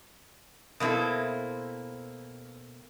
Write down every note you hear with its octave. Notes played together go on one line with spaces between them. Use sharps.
B2 A#3 C4 E4 A4